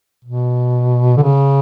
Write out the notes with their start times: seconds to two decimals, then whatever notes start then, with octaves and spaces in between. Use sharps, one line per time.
0.24 B2
1.17 D3
1.23 C#3